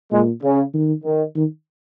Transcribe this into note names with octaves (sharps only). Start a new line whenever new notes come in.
A#2 G#3
C#3
D#3
D#3
D#3